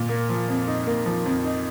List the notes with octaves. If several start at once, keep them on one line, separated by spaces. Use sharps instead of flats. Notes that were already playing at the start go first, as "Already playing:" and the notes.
Already playing: A#2
A#3
F3
F2
D#4
A#3
F3
F2
D#4